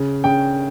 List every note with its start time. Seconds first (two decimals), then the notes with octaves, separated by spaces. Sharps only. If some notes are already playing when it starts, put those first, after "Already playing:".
Already playing: C#3
0.24 C#3 G5